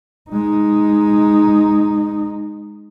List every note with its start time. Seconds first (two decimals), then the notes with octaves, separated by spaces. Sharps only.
0.30 G#3 D#4